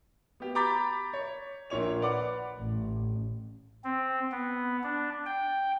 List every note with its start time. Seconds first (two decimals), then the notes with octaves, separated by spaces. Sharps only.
0.40 B3 G4
0.55 A#5 B5 D6 G6 A6 B6
1.13 C#5
1.70 A#1 A#2 C#5 F7
2.02 B4 D5 F#5 D6
2.59 A1
3.84 C4
4.32 B3
4.83 D4
5.26 G5